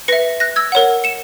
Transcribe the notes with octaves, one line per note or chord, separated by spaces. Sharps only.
B4 E5 A#6 C#7
F#6 A#6
E6 G#6
A#4 C#5 F#5
C#7 E7